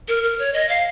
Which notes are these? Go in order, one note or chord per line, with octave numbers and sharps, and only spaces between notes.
A#4
A#4
C#5
D#5
F5